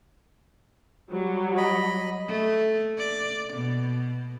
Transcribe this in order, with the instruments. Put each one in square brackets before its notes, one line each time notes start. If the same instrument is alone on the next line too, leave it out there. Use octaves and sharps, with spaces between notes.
[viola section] F#3 G3
[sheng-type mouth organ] D#5 B5
[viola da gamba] A3
D5
B2